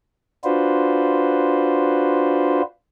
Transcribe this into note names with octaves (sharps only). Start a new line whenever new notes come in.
D4 F4 F#4 B4 C5